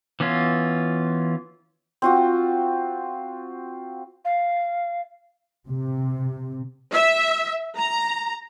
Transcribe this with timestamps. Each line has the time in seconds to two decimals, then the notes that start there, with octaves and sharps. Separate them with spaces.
0.20 E3 B3 C#4 F4
2.02 C4 F4 F#4
4.25 F5
5.69 C3
6.92 E5
7.77 A#5